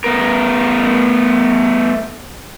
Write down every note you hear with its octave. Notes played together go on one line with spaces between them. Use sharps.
A3 B3 A#4